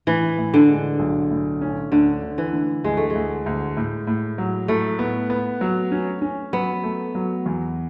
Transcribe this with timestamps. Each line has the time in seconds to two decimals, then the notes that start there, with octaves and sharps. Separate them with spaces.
0.07 A2 E3
0.38 A2
0.54 D3
0.69 G#3
0.99 B1
1.31 A2
1.61 C#4
1.92 D2 D3
2.23 D2
2.38 E3
2.53 D3
2.84 D2 G#3
2.97 A3
3.10 G#3
3.15 D2
3.46 D2
3.77 A2
4.07 A2
4.38 F#3
4.68 A2 A3
4.99 B3
5.30 B3
5.61 F#3
5.92 C#4
6.22 C#4
6.53 F#3 B3
6.84 A3
7.15 F#3
7.46 E2